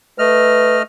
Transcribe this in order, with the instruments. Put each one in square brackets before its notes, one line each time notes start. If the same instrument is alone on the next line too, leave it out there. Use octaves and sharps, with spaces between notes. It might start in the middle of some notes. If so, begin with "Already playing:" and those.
[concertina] A3 D#5 F6 [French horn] B4